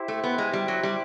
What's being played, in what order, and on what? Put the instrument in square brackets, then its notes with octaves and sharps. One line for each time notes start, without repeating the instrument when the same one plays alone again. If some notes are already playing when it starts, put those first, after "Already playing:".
Already playing: [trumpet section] E4 G4 C5
[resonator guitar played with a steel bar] A3
B3
G#3
G3
F#3
G3